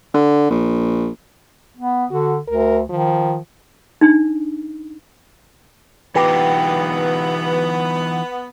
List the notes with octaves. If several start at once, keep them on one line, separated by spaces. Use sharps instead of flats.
D3
A#1
B3
D3 F#4
D2 A#4
D#3 F3
D4 D#4
E3 B3 D#4 F4 G4 B4